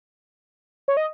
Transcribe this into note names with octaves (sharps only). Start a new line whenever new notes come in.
C#5
D#5